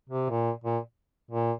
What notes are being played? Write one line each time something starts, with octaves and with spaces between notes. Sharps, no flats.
C3
A#2
A#2
A#2